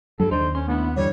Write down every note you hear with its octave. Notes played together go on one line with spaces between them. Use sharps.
G2 F#3 G3 A4
D#2 D#3 D4 D#4 C5
C#4 C6
A3 B3 D4 E4
G2 D3 E3 G3 C#5